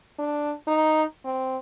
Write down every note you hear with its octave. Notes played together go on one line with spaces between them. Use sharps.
D4
D#4
C4